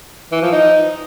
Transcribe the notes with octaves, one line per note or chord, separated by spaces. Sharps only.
E3
F3
D#4